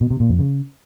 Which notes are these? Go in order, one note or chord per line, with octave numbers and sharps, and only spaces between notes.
B2
C3
A#2
F2
C#3